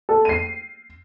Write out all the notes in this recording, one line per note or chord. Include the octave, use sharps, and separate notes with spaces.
A4
C7 D#7